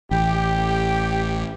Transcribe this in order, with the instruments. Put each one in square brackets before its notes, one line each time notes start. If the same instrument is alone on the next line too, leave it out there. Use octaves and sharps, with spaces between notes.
[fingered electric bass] A1 [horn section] G4